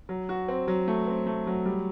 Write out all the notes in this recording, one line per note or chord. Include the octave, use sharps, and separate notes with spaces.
F#3
F#4
C4
F#3
A3
C4
A3
F#3
G3